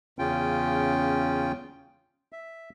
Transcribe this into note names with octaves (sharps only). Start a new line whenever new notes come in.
E2 C#3 C#4 F4 G5
E5